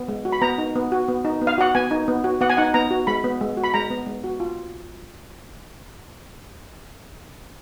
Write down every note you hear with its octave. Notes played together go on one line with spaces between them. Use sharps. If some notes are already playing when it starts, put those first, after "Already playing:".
Already playing: B3
G#3
F#4
B5
B3 A#5
D#4
B3
F#4
B3
D#4
B3
F5
F#4 F#5
B3 G#5
D#4
B3
F#4
B3 F#5
G#5
D#4 F#5
B3 A#5
F#4
G#3 B5
B3
G#3
F#4
B5
G#3 A#5
B3
G#3
F#4
F4